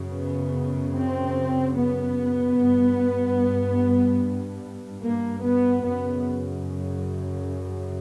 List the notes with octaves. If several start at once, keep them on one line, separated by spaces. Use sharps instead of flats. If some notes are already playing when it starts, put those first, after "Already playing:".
Already playing: F#2 C#3
B3
C4
B3
G2
A#3
B3
F#2 C#3 B3